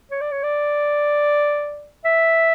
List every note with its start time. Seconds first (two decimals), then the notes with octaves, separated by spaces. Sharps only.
0.11 C#5
0.21 D5
0.32 C#5
0.43 D5
2.05 E5